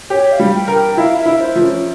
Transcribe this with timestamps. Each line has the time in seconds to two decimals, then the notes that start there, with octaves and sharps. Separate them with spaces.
0.10 G4 C#5
0.32 F5
0.40 G3
0.54 G5
0.68 A#4
0.76 G5
0.97 E4 F5
1.19 E5
1.26 E4
1.40 C5
1.56 F3
1.63 C#4